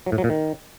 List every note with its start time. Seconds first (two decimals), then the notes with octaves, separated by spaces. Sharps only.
0.06 F#3
0.12 A2
0.18 F#3
0.24 A#2
0.30 D#3